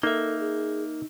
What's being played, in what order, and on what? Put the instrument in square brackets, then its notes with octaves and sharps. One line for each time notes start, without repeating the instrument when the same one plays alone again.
[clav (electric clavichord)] A#3 [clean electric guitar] D#4 E5 [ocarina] A4
[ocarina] G#4